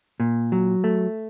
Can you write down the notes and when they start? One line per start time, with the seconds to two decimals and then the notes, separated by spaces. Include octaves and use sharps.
0.20 A#2
0.52 F#3
0.84 A3